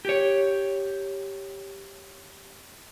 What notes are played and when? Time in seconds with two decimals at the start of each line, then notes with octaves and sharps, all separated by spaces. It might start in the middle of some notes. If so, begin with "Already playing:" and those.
0.05 G4 C#5